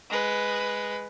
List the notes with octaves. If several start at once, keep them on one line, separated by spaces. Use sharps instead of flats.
G#3 B4